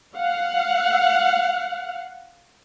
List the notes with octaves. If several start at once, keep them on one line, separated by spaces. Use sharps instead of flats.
F5 F#5